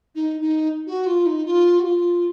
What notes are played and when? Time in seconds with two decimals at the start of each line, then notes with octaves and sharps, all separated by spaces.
0.15 D#4
0.41 D#4
0.87 F#4
1.06 F4
1.26 D#4
1.45 F4
1.79 F#4
1.84 F4